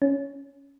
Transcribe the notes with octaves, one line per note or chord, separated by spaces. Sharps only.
C#4